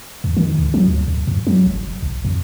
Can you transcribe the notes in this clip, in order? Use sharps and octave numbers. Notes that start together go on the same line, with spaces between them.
E2
D#3
C#2
F#3
D2
D2
F#2
F#3
G1
E1
B1
F2